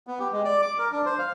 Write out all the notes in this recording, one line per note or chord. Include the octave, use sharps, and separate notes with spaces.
B3
G4
G#3
D5
D6
A#4
D4
C5
F5